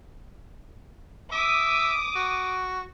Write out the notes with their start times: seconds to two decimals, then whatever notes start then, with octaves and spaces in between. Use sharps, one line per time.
1.32 E5 D6 D#6
2.15 F#4